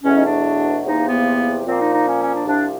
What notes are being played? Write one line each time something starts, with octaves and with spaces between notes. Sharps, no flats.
E2 B2 F#3 A3 C#4
D#4
D4
E2 C3 F3 A#3 D#4
B3
A#2 F3 A#3 C4
D#4
D#4
C#4
C#4
D4
C2 C3 F3 D4